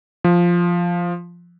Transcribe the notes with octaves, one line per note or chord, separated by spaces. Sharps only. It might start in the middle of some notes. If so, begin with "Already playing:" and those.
F3